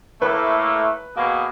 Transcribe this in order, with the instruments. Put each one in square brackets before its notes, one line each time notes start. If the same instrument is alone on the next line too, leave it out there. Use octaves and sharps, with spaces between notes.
[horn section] A2 A3 A#3 [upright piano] B4
[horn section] B2 A#3 G#4